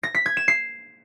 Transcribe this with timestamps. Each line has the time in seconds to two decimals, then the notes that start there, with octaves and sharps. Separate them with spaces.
0.03 A#6
0.15 B6
0.26 G#6
0.37 E7
0.48 C7